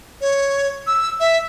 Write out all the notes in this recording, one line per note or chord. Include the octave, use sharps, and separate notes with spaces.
C#5
E6
E5